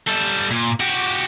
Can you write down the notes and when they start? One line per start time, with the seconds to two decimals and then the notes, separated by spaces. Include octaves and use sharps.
0.07 G3 A4
0.51 A#2
0.80 F#4 G4